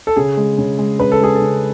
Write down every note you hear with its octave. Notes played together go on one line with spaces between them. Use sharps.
A4
C#3 G#4
G#3
C#3
G#3
C#3 B4
A4
G#3 G#4
A4
C#3